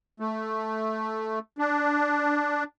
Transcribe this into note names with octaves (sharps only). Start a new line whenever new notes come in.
A3
D4